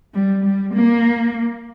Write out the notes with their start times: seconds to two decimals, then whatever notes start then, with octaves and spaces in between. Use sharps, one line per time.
0.14 G3
0.45 G3
0.74 A#3